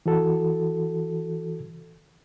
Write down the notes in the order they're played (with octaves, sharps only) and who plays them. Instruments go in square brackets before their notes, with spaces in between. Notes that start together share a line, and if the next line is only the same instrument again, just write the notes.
[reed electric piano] E3 F#4 A4